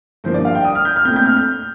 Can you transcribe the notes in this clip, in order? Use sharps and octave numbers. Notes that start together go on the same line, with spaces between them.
G2 F3 A#3 C5
D5
F5
G5
D#6
F6
G6
F6
A#2 A3 C4 G6
G6
F6
G6